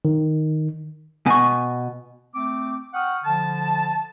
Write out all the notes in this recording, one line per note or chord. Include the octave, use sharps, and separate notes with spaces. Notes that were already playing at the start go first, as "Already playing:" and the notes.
D#3
B2 G#5 C#6
A3 C4 D6
F#5 G5 C#6 D#6 F6
D3 F3 A5